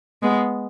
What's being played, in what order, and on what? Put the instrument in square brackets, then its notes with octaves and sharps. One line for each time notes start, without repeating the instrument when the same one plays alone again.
[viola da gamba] G#3 B3